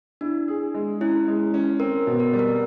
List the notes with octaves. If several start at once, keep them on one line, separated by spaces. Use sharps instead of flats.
D4 E4
G#4
G#3
C#4 E4
G#3
C#4
C4 A#4
B2
A#4
G3
A#4